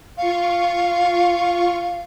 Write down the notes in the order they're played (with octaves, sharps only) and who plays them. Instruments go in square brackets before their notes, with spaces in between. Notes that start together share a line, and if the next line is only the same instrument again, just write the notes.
[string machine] F4 C#6 [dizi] F5